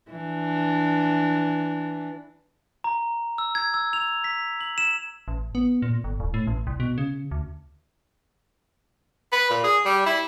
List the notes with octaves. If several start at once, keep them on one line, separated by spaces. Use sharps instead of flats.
E3 D4
A#5
E6
G#6
E6
F7
B6
F#7
E7
A1
B3
A#2
G1
D1
A2
A1
C2
B2
C#3
D2
B4
A#2
G#4
G3
E4